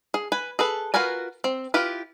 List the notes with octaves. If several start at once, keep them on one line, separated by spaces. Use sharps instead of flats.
G#4
B4 G#5
G#4 A4 B4
F4 F#4 A#4 B4 G#5
C4
E4 F4 G4 B4